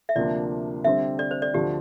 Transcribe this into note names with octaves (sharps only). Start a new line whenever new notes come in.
E5
D2 C3 F3 A#3 D4 D5
D3 G3 C4 E5
D5
C5
D5
D2 D3 F3 G4